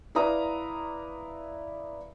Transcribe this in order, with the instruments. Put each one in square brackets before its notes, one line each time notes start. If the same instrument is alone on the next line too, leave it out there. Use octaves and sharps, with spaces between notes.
[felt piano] E4 B4 D5 F5 A#5 D#6